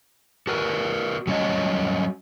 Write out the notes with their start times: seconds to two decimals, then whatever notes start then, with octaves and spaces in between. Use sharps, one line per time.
0.47 F#4 A#4 B4
1.27 F#3 G3 C#4 F#4 C#5 D#5